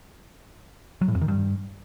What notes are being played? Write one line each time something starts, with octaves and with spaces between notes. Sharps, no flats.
F#3
A2
F2
D#3
G2